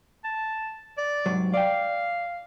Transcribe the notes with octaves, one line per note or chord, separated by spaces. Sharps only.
A5
D5
C2 G#2 F#3
D5 F5 G5